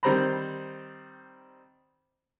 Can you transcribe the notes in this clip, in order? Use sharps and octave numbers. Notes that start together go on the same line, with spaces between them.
D#3 G3 C4 C5 A#5 B5